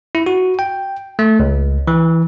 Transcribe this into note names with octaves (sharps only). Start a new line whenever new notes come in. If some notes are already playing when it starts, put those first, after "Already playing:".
E4
F#4
G5
A3
C#2
E3